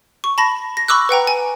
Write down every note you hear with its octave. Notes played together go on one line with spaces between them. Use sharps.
C#6
A5 B5 A#6
A#6
B5 C#6 D6 E6 F#6
B4 F#5 G5 A#5
G#5